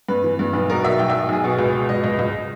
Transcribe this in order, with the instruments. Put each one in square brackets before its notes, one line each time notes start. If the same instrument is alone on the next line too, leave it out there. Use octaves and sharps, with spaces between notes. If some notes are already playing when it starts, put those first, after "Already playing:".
[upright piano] G2 B4
E3
G2
B1 B4
B2 A#4
B1 E5
B1 G5
B1 E5
B1 G#4
B2
C#2
B2
C#2 D#5
C#2
C#2